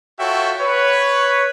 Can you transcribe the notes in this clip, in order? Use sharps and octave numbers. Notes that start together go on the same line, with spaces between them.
F4 F#4 A4 C#5 E5 G5
B4 C#5